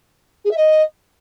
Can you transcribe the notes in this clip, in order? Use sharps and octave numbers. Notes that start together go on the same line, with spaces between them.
G#4
E5
D#5